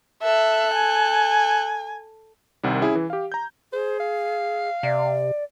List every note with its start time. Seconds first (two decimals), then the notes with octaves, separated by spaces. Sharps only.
0.23 A4 E5 F#6
0.74 G#5
2.63 C2 C3 D#3 G3
2.81 C#4 E4 G#4
2.95 E3
3.10 G4 F5
3.32 A#5 G6
3.73 G#4 C5
4.00 F5
4.83 C3 D5